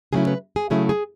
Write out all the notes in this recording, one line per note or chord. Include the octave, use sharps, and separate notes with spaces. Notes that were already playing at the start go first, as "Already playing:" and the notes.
C#3 F#3 A3 C#4 E4 G#4
B4
G#4
C#3 F#3 A3 C#4 E4 G#4
G#4